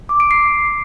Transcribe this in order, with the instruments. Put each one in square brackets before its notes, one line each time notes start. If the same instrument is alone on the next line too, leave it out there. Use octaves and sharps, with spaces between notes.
[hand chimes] D6
D7
C7